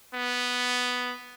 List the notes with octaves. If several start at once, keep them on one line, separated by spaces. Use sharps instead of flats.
B3